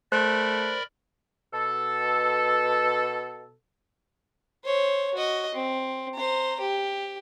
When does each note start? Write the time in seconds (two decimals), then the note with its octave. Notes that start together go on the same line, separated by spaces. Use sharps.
0.12 A3 A#4 C5 D5 B5 F#6
1.53 B2 A4
4.64 C5 C#5
5.14 F#4 D#5
5.54 C4
6.14 C5 A#5
6.60 G4